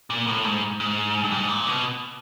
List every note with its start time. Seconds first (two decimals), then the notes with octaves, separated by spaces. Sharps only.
0.10 A#2
0.27 A2
0.44 G#2
0.80 G#2
1.23 G2
1.31 G#2
1.49 A#2
1.67 B2